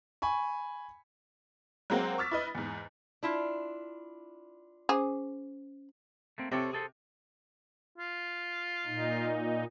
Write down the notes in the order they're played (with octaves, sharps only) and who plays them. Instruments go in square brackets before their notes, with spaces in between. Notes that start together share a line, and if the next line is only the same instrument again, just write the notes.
[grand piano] G#5 B5 C#6
[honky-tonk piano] F#3 G#3 A#3 C4 C5 F#5
C#6 D6 E6 F6 A6 B6
E4 B4 D#5
E2 G#2
[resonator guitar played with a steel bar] D4 E4 F4
[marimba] C#4 C5 D6 [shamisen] G#4
[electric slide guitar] A3 A#3 C4
[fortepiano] C3 [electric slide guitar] C4 A4 C#5
[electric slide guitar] G#4 A4 C5
[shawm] F4
[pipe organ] A#2 D#4